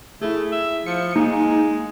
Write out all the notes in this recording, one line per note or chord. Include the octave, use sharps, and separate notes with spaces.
A3 E4 G#4
E5
F3 C#7
G#3 A#3 D#4 G#4 G#5